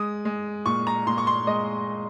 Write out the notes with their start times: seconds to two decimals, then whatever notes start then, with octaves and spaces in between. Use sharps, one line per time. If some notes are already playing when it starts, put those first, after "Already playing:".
Already playing: G#3 D#6
0.25 G#3
0.66 A#2 C#6
0.87 A#5
1.06 A#2 C6
1.18 C#6
1.27 C6
1.47 G#3 D#5